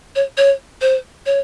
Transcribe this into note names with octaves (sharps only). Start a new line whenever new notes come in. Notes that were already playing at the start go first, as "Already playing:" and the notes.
C#5
C#5
C5
C#5